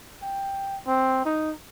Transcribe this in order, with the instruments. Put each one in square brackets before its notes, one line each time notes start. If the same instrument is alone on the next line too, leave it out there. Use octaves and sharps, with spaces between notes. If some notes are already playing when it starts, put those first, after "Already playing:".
[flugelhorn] G5
C4
D#4